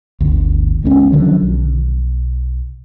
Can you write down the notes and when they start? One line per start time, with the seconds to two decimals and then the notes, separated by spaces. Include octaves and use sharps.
0.21 G1 D2
0.83 C#2 G#3 A3 C#4
1.12 D3 D#3 F3 F#3
1.42 B1